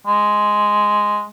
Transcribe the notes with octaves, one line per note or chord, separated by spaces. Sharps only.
G#3